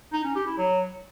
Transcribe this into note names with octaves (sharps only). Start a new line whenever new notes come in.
D#4
C#4
G4
E4
F#3